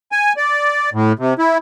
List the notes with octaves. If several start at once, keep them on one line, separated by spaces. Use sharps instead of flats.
G#5
D5
A2
C3
E4